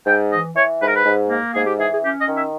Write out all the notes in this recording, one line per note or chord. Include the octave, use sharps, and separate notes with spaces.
G#2 G5
E3 D#5
E3 C#5
G#2 B4
A#4
B4
G#2
A#3
G#2 G#4
G4
E3 G#4
G#4
C#4 G4
D#5
D#3
E5